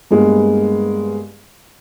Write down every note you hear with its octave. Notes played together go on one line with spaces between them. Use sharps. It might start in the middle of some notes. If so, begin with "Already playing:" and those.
G2 G#3 A#3 B3